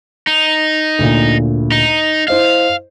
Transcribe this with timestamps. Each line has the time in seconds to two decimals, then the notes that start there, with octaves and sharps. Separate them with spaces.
0.27 D#4
0.99 D2 A#2
1.72 D#4
2.28 E4 C5 D#5 F5